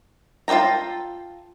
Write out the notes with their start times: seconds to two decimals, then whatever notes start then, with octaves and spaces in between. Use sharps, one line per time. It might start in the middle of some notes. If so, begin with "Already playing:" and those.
0.48 F4 A4 C#5 G5 A#5